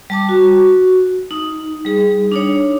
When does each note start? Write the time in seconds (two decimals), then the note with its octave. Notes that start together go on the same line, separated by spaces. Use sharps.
0.10 G3 A5 D6
0.29 F#4
1.31 D#4
1.85 G3 G#4
2.32 D4 D#4 C#5